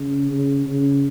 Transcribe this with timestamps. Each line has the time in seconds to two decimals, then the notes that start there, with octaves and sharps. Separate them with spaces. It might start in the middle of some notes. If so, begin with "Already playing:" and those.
Already playing: C#3
0.31 C#3
0.66 C#3